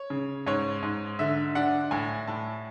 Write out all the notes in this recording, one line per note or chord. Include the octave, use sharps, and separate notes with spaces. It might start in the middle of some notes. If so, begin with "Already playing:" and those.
Already playing: C#5
C#3
G#2 C#5
G#2
D3 E5
D4 F#5
A2 G#5
A2 A5